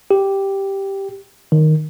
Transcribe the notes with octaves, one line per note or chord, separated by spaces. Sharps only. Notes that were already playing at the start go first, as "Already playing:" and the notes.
G4
D#3